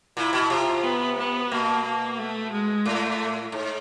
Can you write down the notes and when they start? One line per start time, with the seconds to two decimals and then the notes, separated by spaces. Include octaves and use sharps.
0.17 A#2 E4
0.33 B2
0.50 C3 F4
0.83 B3
1.18 B3
1.51 B2 A#3
1.85 A#3
2.18 A3
2.52 G#3
2.85 A2 A3
3.52 G#2